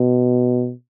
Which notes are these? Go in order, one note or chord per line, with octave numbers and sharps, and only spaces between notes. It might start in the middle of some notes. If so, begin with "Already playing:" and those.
Already playing: B2